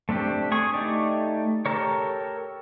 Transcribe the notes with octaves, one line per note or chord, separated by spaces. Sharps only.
A3 C4 D4 G4
G#4 C#6
A3 D#4 G4 D5
G4 A4 A#4 C#5